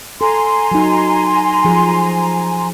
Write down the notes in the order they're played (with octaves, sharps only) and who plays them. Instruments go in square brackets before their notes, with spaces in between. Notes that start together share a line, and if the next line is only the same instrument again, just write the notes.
[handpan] A4 [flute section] G#5 A#5 C6
[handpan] F#3 D#4
F3 G#4